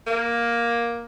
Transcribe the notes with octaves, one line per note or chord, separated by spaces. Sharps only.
A#3